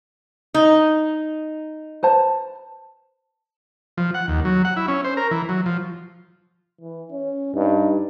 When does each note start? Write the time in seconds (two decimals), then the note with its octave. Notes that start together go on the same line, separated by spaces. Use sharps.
0.54 D#4
2.03 B4 C5 A5
3.98 F3
4.14 F#5
4.28 D#2
4.45 F#3
4.65 F#5
4.76 E4
4.88 C#4
5.04 C5
5.17 A#4
5.31 E3
5.49 F#3
5.66 F3
6.81 E3
7.11 C#4
7.55 G2 D#4